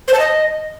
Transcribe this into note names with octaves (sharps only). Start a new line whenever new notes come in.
C5
A5
D#5